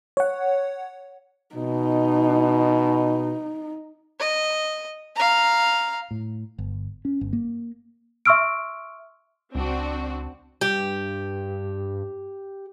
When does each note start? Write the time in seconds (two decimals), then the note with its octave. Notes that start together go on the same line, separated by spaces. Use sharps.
0.17 C#5 F#5
1.55 B2 D#4
4.19 D#5
5.16 F5 A#5
6.11 A2
6.58 G1
7.05 C#4
7.21 G1
7.33 A#3
8.25 E5 C6 C#6 E6 F6 D7
9.55 C#2 C4 D4 F#4
10.61 G2 G4